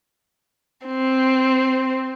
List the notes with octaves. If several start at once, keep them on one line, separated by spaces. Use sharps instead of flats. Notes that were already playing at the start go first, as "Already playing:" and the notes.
C4